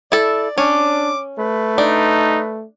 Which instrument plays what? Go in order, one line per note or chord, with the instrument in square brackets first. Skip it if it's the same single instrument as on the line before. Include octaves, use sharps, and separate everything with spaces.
[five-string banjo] E4 A4 [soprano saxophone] D5
[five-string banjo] C#4 [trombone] D4 [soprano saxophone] D6
[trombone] A3 [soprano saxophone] B4
[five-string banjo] D4 [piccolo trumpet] D#4